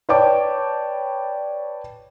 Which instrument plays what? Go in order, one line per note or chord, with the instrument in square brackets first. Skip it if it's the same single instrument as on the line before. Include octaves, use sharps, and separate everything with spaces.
[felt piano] B4 C#5 D5 G5 A5 D6